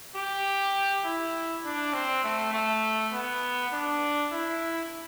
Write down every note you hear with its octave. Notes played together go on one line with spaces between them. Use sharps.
G4
E4
D4
C4
A3
A3
B3
D4
E4